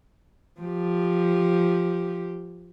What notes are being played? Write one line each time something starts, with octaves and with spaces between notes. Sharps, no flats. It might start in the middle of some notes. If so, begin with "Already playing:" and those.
F3 G4